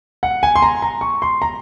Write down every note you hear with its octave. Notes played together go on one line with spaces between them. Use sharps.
F#5
G#5
C6
A#5
A#5
C#6
C6
A#5